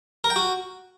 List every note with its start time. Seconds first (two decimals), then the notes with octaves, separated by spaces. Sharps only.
0.24 A#4
0.30 G5
0.36 F#4